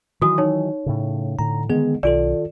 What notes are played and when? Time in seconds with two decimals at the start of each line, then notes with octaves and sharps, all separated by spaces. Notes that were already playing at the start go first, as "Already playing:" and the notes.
0.22 D#3 E3 F#3 F#4 D#6
0.38 D#4 C#5
0.86 A2 C#3
1.39 A2 D3 A#5
1.70 D3 D#3 G#3 B3 G#4
2.03 B1 D#3 F4 A4 D5